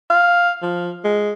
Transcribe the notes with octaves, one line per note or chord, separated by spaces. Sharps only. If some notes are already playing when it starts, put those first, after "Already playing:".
F5
F3
G#3